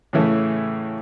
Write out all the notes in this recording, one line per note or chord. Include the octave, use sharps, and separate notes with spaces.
A2 C#3 E3 A3